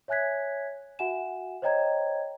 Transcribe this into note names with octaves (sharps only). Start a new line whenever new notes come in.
C#5 E5 G#5 F#6 G#6 B6
F#4 E5 F#5 G#5 E7
C5 C#5 D#5 G5 A#5 G#6